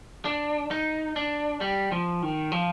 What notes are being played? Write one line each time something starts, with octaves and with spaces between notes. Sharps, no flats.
D4
D#4
D4
G3
F3
D#3
F3